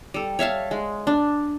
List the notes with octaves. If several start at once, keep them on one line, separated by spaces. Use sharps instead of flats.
G3 A4
C#5 E5 F5 A5
G#3
D4